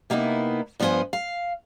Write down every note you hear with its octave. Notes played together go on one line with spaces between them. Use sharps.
C3 A#3 B3 D#4 E4
G2 F3 B3 F4 C5 G#5
F5